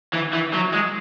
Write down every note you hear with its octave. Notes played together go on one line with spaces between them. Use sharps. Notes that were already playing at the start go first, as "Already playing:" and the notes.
E3
E3
F#3
G#3